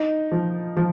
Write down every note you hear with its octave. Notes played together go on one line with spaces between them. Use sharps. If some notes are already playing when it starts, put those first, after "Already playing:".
Already playing: D#4
F3
F3